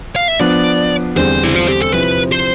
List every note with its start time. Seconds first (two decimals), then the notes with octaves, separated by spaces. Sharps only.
0.16 F5
0.28 E5
0.40 F3 B3 D4 D5
1.16 E2 D3 G3 C4 C5
1.44 E4
1.55 F4
1.68 G4
1.81 A4
1.93 C3 F3 C4 E4 B4
2.32 C5